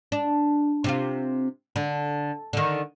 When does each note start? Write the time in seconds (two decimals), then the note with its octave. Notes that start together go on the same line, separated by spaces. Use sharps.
0.12 D4
0.84 C3 C4 F4
1.76 D3
2.53 D3 D#3